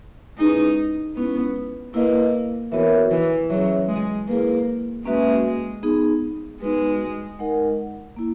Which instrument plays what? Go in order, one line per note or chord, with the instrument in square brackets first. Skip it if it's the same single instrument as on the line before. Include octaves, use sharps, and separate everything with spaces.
[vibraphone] G#3 C#4 E4 G#4 B4 [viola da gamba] D#4
[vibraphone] G#3 C#4 E4 [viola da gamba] B3
[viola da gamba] A#3 [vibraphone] E4 B4 D#5
[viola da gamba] E3 [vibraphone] B3 F#4 A#4 C#5 E5
[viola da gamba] E3
[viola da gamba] F#3 [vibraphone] C#4 G#4 C#5 E5
[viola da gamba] G#3
[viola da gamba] A#3 [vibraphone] E4 G#4 B4
[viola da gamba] G#3 [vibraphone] A#3 C#4 F#4 B4 E5
[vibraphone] B3 D#4 G#4
[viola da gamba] G#3 [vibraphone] B3 D#4 F#4 B4
[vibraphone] G#3 D#4 A#4 D#5 F#5
A#3 E4